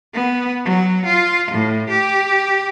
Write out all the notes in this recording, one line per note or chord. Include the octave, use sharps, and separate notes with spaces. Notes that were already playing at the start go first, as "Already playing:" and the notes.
B3
F#3
F4
A2
G4